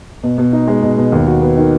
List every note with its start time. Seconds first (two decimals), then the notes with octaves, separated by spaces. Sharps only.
0.23 B2
0.38 B2
0.53 D#4
0.68 G#3
0.82 B2
0.97 B2
1.12 D#2
1.27 F#4
1.42 B3
1.57 D#3